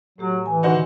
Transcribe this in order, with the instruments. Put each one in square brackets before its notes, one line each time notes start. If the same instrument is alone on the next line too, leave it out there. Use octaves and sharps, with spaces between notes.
[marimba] A2 A3 G4 [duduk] F#3
[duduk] E3 [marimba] G#5
[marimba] D3 D#3 C6 [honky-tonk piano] D#4 F#4 C5